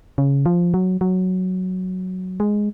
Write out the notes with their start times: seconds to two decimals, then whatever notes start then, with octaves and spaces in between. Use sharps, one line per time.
0.18 C#3
0.46 F3
0.74 F#3
1.01 F#3
2.40 G#3